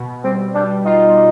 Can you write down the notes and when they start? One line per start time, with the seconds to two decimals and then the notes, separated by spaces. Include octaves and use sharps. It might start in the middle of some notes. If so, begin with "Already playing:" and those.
Already playing: B2
0.24 G3 C4
0.55 G3 D4
0.85 D#4 F4
1.15 G3